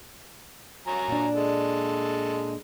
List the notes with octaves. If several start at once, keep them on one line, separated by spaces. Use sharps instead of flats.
F#3 G#5 A#5
A#2 D4
G#3 A4